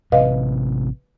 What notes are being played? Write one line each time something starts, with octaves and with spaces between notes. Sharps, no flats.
A1 C3 B4 D#5 F5